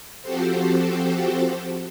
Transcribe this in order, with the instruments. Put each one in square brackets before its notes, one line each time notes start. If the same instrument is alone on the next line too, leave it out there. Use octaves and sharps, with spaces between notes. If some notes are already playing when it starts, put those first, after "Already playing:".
[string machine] F3 C4 F#4 G4 A4 C5